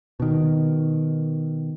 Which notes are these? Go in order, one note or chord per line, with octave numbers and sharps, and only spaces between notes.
B2 D#3